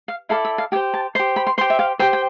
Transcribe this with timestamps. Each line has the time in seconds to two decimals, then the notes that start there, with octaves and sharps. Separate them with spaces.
0.08 F5
0.29 E4 A4 D5 F5
0.45 E5
0.58 F5
0.72 G4 G5
0.75 C5
0.94 A5
1.15 C5 C6
1.19 G4
1.36 B5
1.47 C6
1.58 C5 C6
1.61 G4
1.70 E5
1.79 F5
1.99 G4 C5 G5
2.13 G5